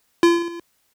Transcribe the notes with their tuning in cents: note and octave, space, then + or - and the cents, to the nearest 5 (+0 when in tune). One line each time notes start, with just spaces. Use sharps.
F4 -40